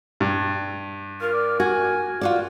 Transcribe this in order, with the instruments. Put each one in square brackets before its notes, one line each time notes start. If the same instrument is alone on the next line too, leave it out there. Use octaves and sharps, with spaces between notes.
[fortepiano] G2
[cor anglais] F4 [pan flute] A#4
[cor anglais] D5
[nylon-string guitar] F#4 [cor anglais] G#5
[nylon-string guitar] F4 F#4 D5